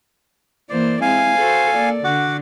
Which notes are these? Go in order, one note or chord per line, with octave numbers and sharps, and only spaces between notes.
E3 A#3 C5 D5
G#3 C4 E4 F5 G#5
F#4 A4 C5
A#3 D5
D3 F#4 F#5 D6